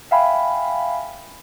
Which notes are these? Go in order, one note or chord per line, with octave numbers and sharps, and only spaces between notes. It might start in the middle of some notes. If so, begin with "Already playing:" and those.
E5 F5 G5 G#5 B5